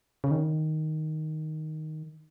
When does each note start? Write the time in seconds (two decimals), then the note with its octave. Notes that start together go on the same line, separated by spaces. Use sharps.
0.24 C#3
0.31 D#3